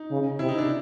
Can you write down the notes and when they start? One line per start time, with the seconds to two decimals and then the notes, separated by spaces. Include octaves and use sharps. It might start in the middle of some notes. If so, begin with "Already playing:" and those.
Already playing: D#4
0.11 C#3
0.39 C3 E4
0.49 D#4
0.58 D4